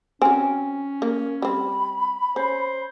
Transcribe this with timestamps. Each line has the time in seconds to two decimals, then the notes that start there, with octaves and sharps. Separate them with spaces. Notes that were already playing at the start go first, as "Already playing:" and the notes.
0.22 F#3 C4 C#4 G#5
1.02 A#3
1.42 G3 C4 B5
2.36 C#4 C5